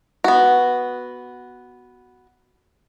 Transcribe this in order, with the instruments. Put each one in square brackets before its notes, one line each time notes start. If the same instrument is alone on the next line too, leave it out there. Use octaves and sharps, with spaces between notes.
[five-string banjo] B3 F#4